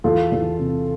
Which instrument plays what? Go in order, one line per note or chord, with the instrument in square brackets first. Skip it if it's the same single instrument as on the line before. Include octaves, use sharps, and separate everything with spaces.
[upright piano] E2 F4 A4
E2
C3